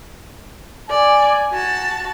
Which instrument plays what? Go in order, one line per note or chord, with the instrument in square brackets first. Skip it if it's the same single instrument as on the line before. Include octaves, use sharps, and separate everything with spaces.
[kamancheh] D5 [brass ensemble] G#5
[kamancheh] F#4 A5